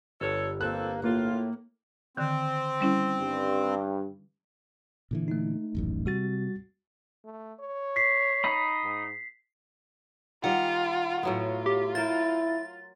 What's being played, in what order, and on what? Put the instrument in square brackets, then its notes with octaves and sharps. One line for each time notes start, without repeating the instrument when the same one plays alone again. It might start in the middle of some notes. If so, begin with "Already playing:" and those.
[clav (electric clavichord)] G1 [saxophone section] A4 C#5
[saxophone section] F2 C4 A4 [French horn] A#3 [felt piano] F#6
[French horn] A2 [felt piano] A#3 [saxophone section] F4
[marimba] D3 D#3 [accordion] C4
[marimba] G3 C#4 E4
[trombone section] G2
[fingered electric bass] A#2 D3 E3
[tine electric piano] A3 D#4
[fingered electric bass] D#1 A1 F#2
[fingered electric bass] C3 [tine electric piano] G3 F#4 A6
[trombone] A3
C#5
[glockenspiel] B6 C7
[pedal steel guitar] D#4 D#5 B5
[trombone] G#2
[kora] D#3 G3 [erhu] F4 [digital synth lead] F#5
[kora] A2 F#3 B3 [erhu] F4
[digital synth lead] G4
[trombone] E4 [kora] A#4 C5 [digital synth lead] A6